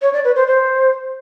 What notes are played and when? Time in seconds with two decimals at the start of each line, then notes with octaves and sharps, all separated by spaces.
0.02 C#5
0.13 D5
0.24 B4
0.36 C5
0.47 C5